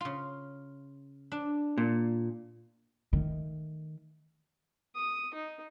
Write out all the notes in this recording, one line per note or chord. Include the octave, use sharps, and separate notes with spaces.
C#3 F4
D4
A#2
D#3 A3
D#6
D#4